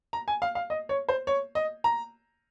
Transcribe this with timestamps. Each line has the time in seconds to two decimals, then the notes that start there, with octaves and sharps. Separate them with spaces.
0.13 A#5
0.28 G#5
0.42 F5
0.55 F5
0.70 D#5
0.89 C#5
1.09 C5
1.27 C#5
1.55 D#5
1.84 A#5